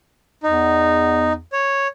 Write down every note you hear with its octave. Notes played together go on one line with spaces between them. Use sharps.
E2 D#4
C#5